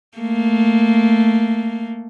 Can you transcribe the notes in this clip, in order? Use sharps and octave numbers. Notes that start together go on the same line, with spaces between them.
A3 A#3